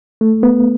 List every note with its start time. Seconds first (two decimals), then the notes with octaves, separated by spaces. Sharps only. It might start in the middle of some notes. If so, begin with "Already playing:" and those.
0.21 A3
0.43 B3